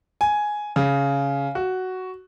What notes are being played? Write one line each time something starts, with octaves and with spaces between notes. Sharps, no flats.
G#5
C#3
F#4